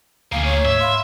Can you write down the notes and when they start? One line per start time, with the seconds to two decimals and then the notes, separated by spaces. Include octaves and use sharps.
0.32 D2 D3 A#3 G#4 F5
0.45 C#5
0.65 G#2 E5
0.80 F5 B5 C6